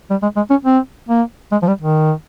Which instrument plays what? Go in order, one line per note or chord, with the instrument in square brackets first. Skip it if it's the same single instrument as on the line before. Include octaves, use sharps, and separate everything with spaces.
[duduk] G3
G#3
G#3
C#4
C4
A#3
G#3
F3
G3
D#3